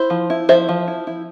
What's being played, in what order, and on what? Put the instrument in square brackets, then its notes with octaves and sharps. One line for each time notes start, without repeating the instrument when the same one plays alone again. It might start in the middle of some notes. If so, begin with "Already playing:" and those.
Already playing: [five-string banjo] E4 C5
F3
E4
F3 C5 E5
F3
E4
E4